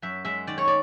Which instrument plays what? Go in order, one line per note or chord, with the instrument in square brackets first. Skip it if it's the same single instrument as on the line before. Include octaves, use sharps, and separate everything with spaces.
[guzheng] F#2 E5
G#3 E5
D#3 D5
C#5
D5